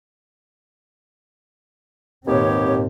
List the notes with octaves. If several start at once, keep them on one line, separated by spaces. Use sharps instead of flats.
G#1 D#2 A#2 B3 C4 G4 C#5